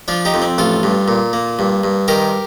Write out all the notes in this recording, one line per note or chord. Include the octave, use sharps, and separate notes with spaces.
F3 D4 F4
D#4 G4
F2
C4
A1 F4 A4
G2
A#2
A#3
G2
G2
D#3 G4 A#4